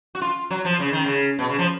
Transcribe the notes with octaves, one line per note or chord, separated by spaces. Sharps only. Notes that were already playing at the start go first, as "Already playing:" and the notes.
F#4
F4
F#3
F3
C#3
D#3
C#3
B2
C#3
F3